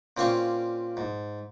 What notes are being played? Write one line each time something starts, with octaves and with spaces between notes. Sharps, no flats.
A#2 C4 C#4 D5 F5 C#6
G#2